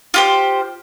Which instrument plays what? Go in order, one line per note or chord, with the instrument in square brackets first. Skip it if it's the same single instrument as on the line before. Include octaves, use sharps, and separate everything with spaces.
[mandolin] F4 G4 C5